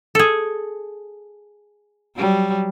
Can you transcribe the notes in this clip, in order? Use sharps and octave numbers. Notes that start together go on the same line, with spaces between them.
G#4 A4
F#3 G3